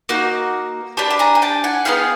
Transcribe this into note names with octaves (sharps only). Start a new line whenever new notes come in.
A#3 D#4 F#4
D4 G4 A5 B5
A5
G#5 A#5
G#5
G5 A5
F#5 G#5
B3 E4 G#4 F5 G5